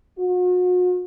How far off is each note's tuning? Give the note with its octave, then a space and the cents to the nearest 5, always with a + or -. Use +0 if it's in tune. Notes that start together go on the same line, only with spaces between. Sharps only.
F#4 -40